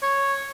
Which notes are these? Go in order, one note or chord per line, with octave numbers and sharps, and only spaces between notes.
C#5